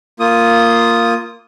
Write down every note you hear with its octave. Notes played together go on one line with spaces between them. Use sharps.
A#3 F4 D#6